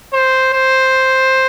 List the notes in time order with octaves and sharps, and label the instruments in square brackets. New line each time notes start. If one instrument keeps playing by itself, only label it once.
[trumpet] C5
C5